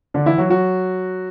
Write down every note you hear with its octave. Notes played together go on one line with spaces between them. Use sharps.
D3 D4
E3 E4
F#3 F#4
F#3 F#4